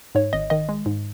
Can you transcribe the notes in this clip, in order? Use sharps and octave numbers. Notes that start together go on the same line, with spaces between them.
G#2 C#5
G#1 D#5
D#3 D#5
G#3
G#2